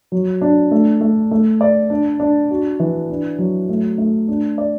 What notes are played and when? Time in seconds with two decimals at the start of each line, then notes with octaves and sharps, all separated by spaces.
0.12 F#3
0.42 D4
0.71 A3
1.01 A3
1.31 A3
1.61 D5
1.90 D4
2.20 D4
2.51 F#4
2.80 E3
3.10 D4
3.39 F#3
3.69 A3
3.98 A3
4.28 D4
4.58 D5